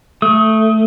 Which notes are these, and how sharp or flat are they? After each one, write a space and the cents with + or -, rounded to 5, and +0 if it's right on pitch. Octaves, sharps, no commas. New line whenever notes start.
A3 +0 D#6 +30